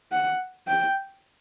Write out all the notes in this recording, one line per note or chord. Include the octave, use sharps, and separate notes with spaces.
F#5
G5